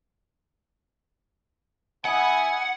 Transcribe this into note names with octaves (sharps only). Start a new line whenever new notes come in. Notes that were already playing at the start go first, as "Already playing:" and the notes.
B3 E4 D#5 F#5 G#5